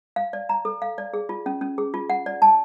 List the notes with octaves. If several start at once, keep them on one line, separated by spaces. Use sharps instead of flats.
F5
D5
A#5
A4
F5
D5
G#4
F4
C#4
C#4
G#4
F4
F#5
D5
A5